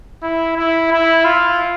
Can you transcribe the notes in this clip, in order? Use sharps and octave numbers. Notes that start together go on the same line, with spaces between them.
E4
E4
E4
F4